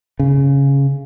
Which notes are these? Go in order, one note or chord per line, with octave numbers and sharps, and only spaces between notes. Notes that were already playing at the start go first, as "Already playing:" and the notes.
C#3